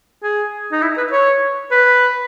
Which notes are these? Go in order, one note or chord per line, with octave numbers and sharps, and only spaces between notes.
G#4
D#4
E4
B4
C#5
B4